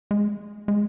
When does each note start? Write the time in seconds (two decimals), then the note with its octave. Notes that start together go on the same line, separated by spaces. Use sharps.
0.11 G#3
0.68 G#3